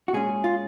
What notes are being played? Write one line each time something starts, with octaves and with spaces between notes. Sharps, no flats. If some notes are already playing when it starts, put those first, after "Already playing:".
F#4
A#2 G#3 C#4 G#4
F4